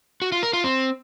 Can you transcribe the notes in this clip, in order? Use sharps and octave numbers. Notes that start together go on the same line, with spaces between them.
F#4
F4
A#4
F4
C4